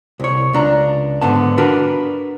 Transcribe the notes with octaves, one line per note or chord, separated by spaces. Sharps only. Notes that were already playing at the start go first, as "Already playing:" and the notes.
C2 C#5
C#2 D4 A#5
G#2 D3 B3 A5
D4 F#4 A#4 B4